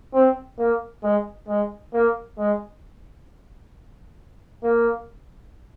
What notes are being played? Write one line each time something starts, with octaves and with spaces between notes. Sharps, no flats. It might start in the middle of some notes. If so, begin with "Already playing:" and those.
C4
A#3
G#3
G#3
A#3
G#3
A#3